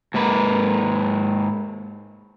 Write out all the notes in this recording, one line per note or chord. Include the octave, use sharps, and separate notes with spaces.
G#2 A#3 B4